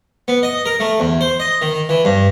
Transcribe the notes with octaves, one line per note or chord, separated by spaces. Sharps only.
B3
D#5
A#4
A3
E2
C5
D#5
D#3
E3
G2